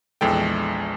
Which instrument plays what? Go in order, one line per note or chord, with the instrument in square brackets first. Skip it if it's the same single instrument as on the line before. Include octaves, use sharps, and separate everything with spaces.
[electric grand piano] A#1 E2 G#3 A4 G5